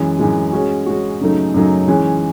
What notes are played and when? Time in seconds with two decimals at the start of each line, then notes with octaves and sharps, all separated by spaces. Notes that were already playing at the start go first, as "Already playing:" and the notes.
Already playing: F#2 E3 G#3
0.19 F#2 E3 G#3
0.53 G#3 C#4 F#4
0.86 G#3 C#4 F#4
1.21 F#2 C#3 F#3 A3 D#4
1.54 F#2 C#3 F#3 A3 D#4
1.88 E3 G#3 C#4